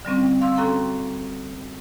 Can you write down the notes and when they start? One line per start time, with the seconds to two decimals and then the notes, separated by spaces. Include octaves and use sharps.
0.05 D3 G3 C4 C#4
0.41 F5 C6 E6
0.56 C#4 F#4 A4 G5 A#5 C6